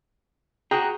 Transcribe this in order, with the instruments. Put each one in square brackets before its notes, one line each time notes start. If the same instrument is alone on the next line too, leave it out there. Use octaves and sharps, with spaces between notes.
[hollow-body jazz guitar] F#4 G#4 [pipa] G5 [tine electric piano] A#5 D#6 F#6